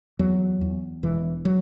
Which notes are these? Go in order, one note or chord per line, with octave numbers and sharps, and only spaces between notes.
E2 F#3
E2
E1 E3
F#3